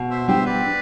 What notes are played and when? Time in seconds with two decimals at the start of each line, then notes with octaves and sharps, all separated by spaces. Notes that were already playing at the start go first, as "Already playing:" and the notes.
Already playing: B2
0.10 C5 E5
0.28 G3 B3 D4 G4 C5 E5
0.45 B4 D5